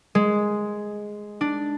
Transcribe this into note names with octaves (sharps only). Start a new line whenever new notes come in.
G#3
D4